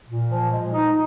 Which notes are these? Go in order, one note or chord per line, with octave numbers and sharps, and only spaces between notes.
A#2
F3
G#3
D#4